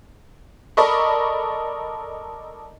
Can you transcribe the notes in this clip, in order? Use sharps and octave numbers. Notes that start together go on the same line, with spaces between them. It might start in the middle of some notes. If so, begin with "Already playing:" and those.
A4 A#4 D5 D#5 B5 C#6